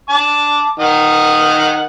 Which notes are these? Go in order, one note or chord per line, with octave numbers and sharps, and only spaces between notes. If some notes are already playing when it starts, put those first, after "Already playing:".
A5 D6
D#3 D#5 F#5